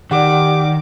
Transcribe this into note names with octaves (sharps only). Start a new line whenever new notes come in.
D#3 G4 D5 F#5 D6